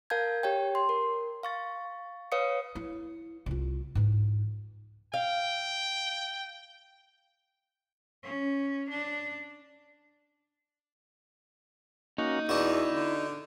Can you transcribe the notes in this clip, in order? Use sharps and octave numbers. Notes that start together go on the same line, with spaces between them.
A#4 F5 A5 G6 G#6
G4 C#5 G5
C6
A#4
F5 C#6 A6
B4 C#5 F5 D#6 C#7
E4
C2 F4
G#2 E3
F5 G5
C#4
D4
A#3 C#4 D#4 F#4
E2 D4 E4 F#4
D3